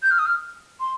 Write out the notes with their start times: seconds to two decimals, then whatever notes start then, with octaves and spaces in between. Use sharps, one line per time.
0.03 G6
0.11 F6
0.19 D#6
0.26 F6
0.80 C6